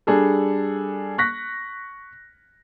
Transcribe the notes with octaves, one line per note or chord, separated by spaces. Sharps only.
G3 D4 G#4 A4
C#6 F#6 A#6 B6